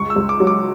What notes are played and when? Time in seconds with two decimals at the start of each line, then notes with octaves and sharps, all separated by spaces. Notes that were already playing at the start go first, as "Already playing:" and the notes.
Already playing: C#2 C#6
0.10 E6
0.16 C#2
0.29 D6
0.40 F#3
0.47 D6